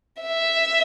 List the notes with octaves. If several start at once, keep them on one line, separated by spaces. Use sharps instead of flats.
E5